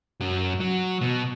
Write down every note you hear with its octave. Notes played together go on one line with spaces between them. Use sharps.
F#2 F#3
F#3
B2